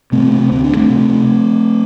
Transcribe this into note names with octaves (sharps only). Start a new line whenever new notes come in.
C3 A3 C4
A3 C4
D2 C4
D4
A3 C4
C3